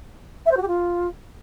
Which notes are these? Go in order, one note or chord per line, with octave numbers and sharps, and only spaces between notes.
E5
C5
F#4
G4
F4